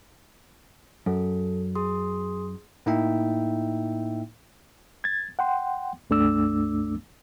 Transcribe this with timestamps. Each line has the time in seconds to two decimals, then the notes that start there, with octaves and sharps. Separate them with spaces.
1.06 F#2 A4
1.75 G#4 C6 D#6
2.86 A2 A#3 D#4 E4 E5 G5
5.04 G#6 A6
5.39 F#5 G5 C6
6.10 C#2 G2 A3 D4 D6 E6